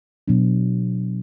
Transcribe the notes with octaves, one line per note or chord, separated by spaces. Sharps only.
B2 F#3 B3 D4